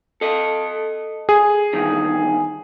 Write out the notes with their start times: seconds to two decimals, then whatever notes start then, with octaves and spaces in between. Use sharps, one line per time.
0.21 A4 D#5
1.29 G#4
1.73 E2 G2 D#3